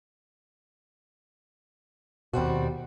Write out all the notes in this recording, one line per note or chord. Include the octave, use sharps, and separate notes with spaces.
D#2 B2 G3 C4 F#4